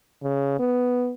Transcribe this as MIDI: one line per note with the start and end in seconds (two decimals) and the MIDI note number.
0.23 0.59 49
0.59 1.13 59